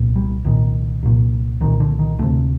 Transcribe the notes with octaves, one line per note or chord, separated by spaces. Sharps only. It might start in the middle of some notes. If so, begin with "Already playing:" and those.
Already playing: C2 A#2
G3
C2 A#2 D#3
C2 A#2
C2 A#2 D#3
D3
D#3
D2 C3 A3